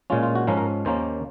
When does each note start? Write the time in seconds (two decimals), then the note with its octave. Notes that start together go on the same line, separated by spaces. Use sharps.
0.10 A#2 G#3 C#4 F4
0.23 F4
0.35 F#4
0.47 G#2 F3 G#3 C#4 A#4
0.57 A#4
0.85 D#2 D#3 A#3 C#4 C5